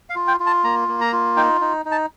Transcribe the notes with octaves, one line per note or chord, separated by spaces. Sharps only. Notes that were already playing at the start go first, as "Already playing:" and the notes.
F5
F4
G5
F4
A5
A#3 A#5
A#3
A#5
F4
D#4 G5
D#4
D#4
A5